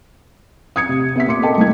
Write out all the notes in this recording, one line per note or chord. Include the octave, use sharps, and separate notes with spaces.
D#6 G#6 C#7
C3
B3 E5 B6
A#2 C6 D6 C#7
A4 A#4 D#5 G5 A5 D6
C2 A#2 G#3 E4 G#6